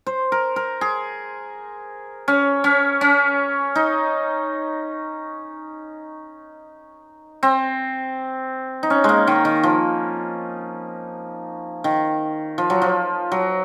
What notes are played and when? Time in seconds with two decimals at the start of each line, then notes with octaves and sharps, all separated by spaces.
0.07 C5
0.32 A#4
0.56 A#4
0.81 G#4
2.28 C#4
2.64 C#4
3.01 C#4
3.75 D#4
7.43 C4
8.83 D#4
8.90 C#4
9.04 G#3 A#3
9.27 D#3
9.45 D#3
9.63 F3
11.84 D#3
12.58 F3
12.70 F#3
12.82 F3
13.32 F#3